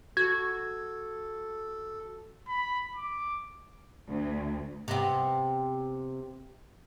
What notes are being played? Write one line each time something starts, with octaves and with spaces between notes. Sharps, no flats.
F#4 A4 G#6
B5
D6
D2
C3 B3